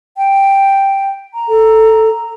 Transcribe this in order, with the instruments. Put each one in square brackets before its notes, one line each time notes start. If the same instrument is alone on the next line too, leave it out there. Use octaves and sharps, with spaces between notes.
[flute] G5
A#5
[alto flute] A4